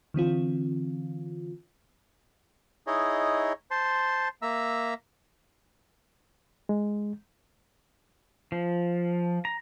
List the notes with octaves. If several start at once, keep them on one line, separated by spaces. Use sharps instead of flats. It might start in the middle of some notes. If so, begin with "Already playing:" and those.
D3 E3 C4 F4
D#4 E4 G#4 C#5 D#5
C5 A5 C6
A#3 E5 A#5 E6
G#3
F3
A#5